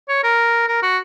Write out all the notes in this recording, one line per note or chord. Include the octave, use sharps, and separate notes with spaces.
C#5
A#4
A#4
F#4